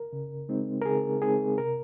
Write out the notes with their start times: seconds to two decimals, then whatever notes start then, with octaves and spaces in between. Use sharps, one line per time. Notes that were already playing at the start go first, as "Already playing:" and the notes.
Already playing: A#4
0.13 C#3
0.49 G#3 C4 D#4
0.81 A#4
0.85 C#3 G#4
1.22 G#3 C4 D#4 G#4
1.58 C3 A#4